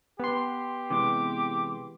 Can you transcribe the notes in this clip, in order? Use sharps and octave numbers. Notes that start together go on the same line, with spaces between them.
B3 G4 C6
C3 E3 G#3 D6